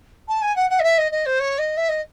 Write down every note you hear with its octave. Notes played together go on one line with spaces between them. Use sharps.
A5
G#5
F#5
F#5
D#5
E5
D#5
D#5
C5
C#5
D#5
E5
D#5